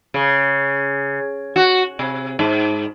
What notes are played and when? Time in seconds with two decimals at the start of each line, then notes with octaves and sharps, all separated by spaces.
0.14 C#3
1.56 F#4
1.99 C3
2.39 G#2